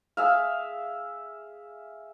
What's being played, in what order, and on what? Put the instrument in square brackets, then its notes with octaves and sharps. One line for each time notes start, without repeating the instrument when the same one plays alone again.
[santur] G#4 E5 F5